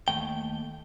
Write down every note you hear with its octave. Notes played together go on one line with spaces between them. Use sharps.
D#2 E3 A3 G5